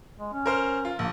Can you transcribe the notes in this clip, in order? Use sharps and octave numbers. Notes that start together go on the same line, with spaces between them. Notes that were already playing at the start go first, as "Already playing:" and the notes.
G#3
C#4
A#4 C5 F6
F4
A#1 A#3